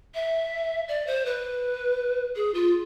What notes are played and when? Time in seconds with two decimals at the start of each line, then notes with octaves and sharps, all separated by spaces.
0.14 E5
0.88 D5
1.07 C5
1.26 B4
2.36 G#4
2.54 F4